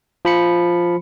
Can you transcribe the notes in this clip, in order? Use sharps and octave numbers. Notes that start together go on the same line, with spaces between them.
F3 B5 C#7